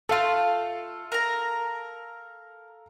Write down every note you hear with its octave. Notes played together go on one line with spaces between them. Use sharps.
A3 F4 A4 F5
A#4 A#5